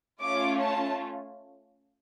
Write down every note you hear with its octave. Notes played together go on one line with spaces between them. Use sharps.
A3 C#4 F4 D6
A5